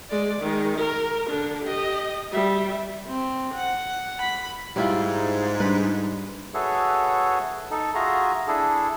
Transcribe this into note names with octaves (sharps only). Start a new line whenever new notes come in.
G#3 D5
D#3 G#3
A#4
D3 D4
G4 D#5
G3 E5
C4
F#5
B5
G#2 G3 E4 F4
G3 D4 B4
F#4 G#4 A4 B4 C#5 E5
D#4 A4
F4 F#4 G#4 E5 A#5
D4 E4 G#4 A4